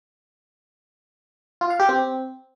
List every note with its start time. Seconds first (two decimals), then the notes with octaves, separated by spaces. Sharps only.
1.61 F4
1.70 F5
1.80 G4
1.89 C4